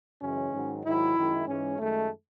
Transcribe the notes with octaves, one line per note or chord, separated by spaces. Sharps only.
F#2 C#3 E3 G#3 C#4
G#2 D#3 F#3
G#2 D#3 F#3 E4
F#2 D#3 G#3
G#2 E3 G#3 C#4
F#2 D#3 G#3 A3